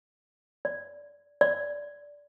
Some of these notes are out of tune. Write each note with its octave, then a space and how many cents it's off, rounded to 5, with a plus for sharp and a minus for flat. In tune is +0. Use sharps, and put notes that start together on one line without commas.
D5 -20
D5 -15